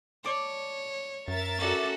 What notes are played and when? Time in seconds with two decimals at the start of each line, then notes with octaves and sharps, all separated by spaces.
0.24 C#5 D5 A5
1.28 F#2 A#4 E5 A6
1.59 C#4 F#4 A4 C#5 D5